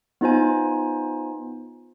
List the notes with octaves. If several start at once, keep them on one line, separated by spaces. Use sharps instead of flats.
B3 D#4 F4 C5 G#5